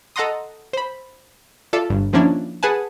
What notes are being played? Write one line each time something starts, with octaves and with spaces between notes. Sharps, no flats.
A4 D#5 F#5 A#5 C6 D#6
C5 B5
F4 A4 D5 E5
G1
D#3 F3 A#3 C#4 D4 E4
G#4 B4 F#5 G#5 A5